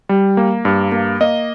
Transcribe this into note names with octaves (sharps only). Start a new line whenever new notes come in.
G3
A#3
G2
A#3
A#3 D#5